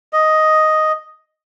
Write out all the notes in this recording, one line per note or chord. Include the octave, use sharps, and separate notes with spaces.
D#5